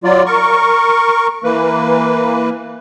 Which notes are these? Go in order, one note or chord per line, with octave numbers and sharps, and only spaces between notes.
F#3 F4 D5
A#4 C#6
E3 A#3 B4